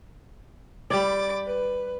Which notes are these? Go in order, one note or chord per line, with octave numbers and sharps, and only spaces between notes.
G3 D5 B5 D6 A6
B4